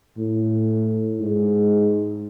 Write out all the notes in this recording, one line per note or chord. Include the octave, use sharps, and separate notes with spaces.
A2
G#2